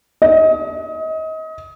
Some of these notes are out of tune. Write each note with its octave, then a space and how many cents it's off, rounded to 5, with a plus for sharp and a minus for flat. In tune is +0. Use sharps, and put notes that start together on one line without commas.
D#5 +30